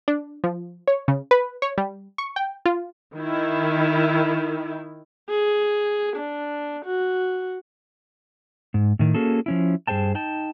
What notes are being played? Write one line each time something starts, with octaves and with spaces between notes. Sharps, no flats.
D4
F3
C#5
C#3
B4
C#5
G3
C#6
G5
F4
D#3 E4
G#4
D4
F#4
G#2
A2 D#3
A#3 C#4 F#4 G#4 A4
F3 C#4 E4
G2 G#4 C5 G5 A5
D#4 G5 A5